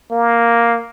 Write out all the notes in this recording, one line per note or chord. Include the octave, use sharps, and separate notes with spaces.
A#3